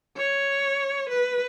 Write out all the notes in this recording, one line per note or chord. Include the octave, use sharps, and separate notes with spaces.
C#5
B4